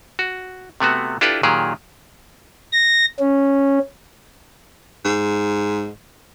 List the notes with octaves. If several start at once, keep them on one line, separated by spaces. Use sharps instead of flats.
F#4
C3 A3 B3 F#4
D4 E4 F4 G4 A4 B4
A#2 D#3 F#3 G4 G#4
A#6
C#4
G#2